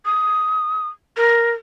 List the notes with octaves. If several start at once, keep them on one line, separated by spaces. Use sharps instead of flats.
D#6
A#4